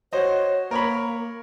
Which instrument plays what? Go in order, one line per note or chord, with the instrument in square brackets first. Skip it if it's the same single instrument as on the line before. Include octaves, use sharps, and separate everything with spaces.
[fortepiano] F#4 C5 D#5 [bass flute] C#5
[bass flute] A#3 [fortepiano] A#4 C#5 B5